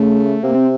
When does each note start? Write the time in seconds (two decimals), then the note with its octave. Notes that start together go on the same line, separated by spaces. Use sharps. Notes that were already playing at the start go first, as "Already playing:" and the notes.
Already playing: C#3 A3
0.43 C3 A#3
0.55 C4